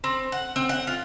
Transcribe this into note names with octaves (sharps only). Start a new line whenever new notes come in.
C4
F#5
C4
F#5
F4